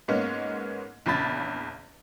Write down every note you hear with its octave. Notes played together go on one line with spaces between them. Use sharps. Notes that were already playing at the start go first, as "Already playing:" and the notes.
G#2 G#3 A#3 B3 C#4
A#1 E2 C#3 B5 A6